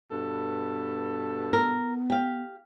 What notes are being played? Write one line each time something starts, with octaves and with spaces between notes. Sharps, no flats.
G2 B2 A4
B3 A#4
G4 F5